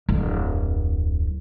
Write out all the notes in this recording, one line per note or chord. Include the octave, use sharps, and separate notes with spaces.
D1 F2